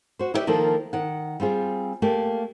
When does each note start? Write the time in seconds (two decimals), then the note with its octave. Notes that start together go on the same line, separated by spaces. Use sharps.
0.19 F#4 C5
0.34 D#4 E4 G4 B4 D5 E5
0.47 D#3 F3 A#3 A4
0.93 D#3 F#5
1.40 G3 C4 F4 G#4
2.02 A3 A#3 G4